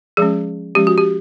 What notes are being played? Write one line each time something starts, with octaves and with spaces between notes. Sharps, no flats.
F3 G#3 C#4 G#4
F3 G#3 C#4 G4
F#4
G4